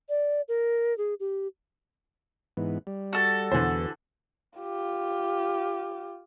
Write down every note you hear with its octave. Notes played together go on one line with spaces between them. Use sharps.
D5
A#4
G#4
G4
G#2 E3 B3
G3
F#4 A4
E2 D3 E3 B3 C5
F4 G4